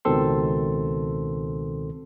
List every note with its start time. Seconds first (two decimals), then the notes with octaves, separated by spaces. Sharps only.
0.05 C#2 B2 D#3 C4 A4 C6